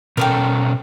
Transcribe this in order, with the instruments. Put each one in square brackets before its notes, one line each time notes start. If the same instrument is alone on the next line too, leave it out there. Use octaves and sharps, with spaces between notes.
[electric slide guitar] B2 C#4 A4 [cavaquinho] A#4 D5 G5